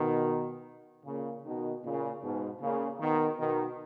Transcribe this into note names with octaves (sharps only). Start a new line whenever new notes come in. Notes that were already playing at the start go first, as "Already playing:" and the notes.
Already playing: B2 D#3
A#2 C#3
B2 D#3
A#2 C#3
G#2 B2
A#2 C#3
B2 D#3
B2 D#3